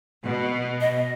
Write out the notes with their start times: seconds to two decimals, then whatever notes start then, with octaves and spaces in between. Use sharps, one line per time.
0.25 B2
0.81 D#5